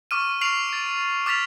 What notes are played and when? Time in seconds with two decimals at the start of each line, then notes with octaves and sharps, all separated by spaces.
0.11 C#6 D6 F6 D#7
0.41 C#6 F6 C7 D7 F7 F#7
0.69 A6 D7
1.26 D6 F6 A6 B6 F7